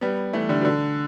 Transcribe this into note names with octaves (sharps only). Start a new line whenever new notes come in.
G3 B3
E3 A3
D3 G3
B2
D3